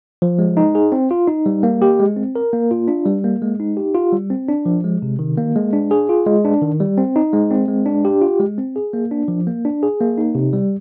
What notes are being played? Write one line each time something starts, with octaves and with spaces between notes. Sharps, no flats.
F3
G#3
D#4
G#4
C4
F4
D#4
G3
A#3
G4
G#3
C4
A#4
A#3
F4
D4
G3
A#3
G#3
D#4
G4
F4
G3
C4
D4
F3
G#3
C3
D#3
A#3
G#3
D4
G#4
F4
G#3
D4
D#3
G3
C4
D#4
G#3
C4
G#3
D4
G4
F4
G#3
C4
G#4
A#3
D4
F3
A#3
D4
G#4
A#3
D#4
C3
G3